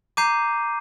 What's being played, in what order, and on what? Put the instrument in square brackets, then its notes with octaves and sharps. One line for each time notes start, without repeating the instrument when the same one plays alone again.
[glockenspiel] A#5 D6 G6 C7 D#7